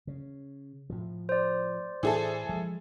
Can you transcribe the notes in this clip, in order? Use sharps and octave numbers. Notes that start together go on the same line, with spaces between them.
C#3
A2 F3
C5 D5
A2 E3 G#4 A4
F3 G#3